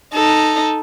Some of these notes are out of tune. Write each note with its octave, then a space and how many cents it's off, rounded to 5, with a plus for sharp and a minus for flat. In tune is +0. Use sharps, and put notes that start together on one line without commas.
D#4 -5 A4 +0